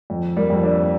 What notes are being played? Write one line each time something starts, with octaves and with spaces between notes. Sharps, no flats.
F2
G3 A#3
F2
A#3 D4